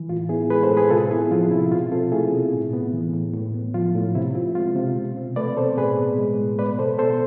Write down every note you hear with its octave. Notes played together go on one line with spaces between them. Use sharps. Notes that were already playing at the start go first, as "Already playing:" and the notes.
Already playing: E3
A2 F4
B3 E4 G#4
G#3 G#4 B4
A4 C5
A2
G#4 B4
C3 F4 A4
B3 E4 G#4
F3 F4
C3 E4
B2 F4
C4 F4 A4
A3 E4 G#4
B2
A2
B3
E3
A2
A2
B3
F3 F4
A2
C3 E4
C4 F4
G#3 F4
C3
B2
C4
A3 B4 D5
B2 A4 C5
A2 G#4 B4
B3
G#3
A2
B3 B4 D5
B2 A4 C5
B3 A4 C5